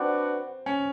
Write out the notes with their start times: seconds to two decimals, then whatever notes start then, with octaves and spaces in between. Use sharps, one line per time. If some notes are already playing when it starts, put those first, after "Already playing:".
Already playing: C4 D4 F#4 B4 D5 F#5
0.66 C#4